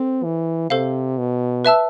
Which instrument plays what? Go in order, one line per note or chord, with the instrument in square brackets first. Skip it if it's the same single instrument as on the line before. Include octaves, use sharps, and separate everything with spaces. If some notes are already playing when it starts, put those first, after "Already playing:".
Already playing: [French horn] C4 [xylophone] A4 C5
[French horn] E3
[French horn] C3 [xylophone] A4 C5 F5
[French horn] B2
[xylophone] B4 E5 A5 E6